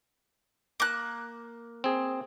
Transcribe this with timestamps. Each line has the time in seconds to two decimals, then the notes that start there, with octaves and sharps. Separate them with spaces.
0.80 A#3 F#6
1.84 C4 G#4